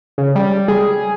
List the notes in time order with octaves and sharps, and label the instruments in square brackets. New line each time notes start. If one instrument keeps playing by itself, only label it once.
[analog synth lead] C#3
G3
G#4